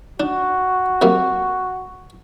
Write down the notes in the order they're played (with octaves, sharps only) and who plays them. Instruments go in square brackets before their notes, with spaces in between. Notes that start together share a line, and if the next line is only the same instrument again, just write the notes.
[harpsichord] D4 [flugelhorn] F#4
[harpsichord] C3 F#3 A#3